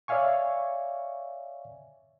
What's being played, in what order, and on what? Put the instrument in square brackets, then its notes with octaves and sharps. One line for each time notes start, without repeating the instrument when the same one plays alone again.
[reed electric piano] C#5 D5 E5 F5 G#5 C#6